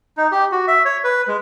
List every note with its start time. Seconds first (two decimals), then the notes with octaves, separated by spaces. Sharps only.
0.17 D#4
0.32 G4
0.52 F#4
0.68 E5
0.85 C#5
1.04 B4
1.28 G#3